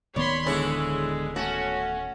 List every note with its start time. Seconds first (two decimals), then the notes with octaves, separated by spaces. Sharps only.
0.16 D1 D#3 B3 C#5 D5 B5 C6
0.46 D3 E3 G#3 E4 C#5
1.36 A3 C#4 F#4